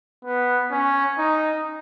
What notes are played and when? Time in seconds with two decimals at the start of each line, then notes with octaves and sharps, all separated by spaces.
0.25 B3
0.71 C#4
1.18 D#4